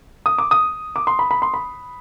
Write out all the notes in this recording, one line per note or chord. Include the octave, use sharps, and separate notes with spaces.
D#6
D6
D#6
D6
C6
B5
B5
C6
B5